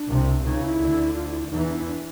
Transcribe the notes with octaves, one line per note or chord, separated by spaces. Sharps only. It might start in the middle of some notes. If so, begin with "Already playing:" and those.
Already playing: D4
C2 C3
C#2 C#3 D#4
E4
D2 D3
F4
E4
E2 E3 D#4
D4
D4